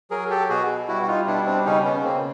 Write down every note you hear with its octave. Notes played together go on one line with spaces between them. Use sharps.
F#3 G#4 A#4
G4 A4
B2 F#4 G#4
G3 E4 F#4
F#4
D#4 F4
B2 D4 E4
C4 D4
C#3 C#4 D#4
B3 C#4
C#3 A#3 C4